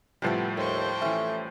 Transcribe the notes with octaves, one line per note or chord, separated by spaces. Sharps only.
A2 C3 F3 G3 B3 C4
D#2 A4 C5 G5 C#6
E3 A3 C#4